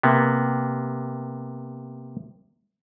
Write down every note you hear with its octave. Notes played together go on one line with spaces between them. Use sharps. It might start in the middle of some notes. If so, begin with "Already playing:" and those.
C3 A#3 B3